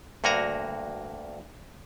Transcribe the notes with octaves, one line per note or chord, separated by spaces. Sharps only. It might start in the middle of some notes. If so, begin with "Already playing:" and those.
D2 G2 A#3 F#4 G#5 A#5